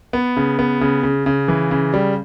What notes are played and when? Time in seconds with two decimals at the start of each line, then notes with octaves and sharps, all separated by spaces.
0.13 B3
0.37 C#3
0.59 B3
0.81 C#3
1.03 C#3
1.26 C#3
1.48 E3
1.71 C#3
1.94 G3